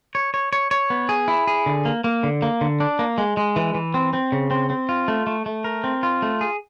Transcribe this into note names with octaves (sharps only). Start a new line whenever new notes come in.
C#5
C#5
C#5
C#5
B3
G#4
E4
G#4
D3
A#3
A#3
D3
A#3
D3
D4
A#3
G#3
G#3
E3
E3
C4
C4
C#3
C4
C4
F4
A3
A3
A3
A#4
C4
F4
A3
G#4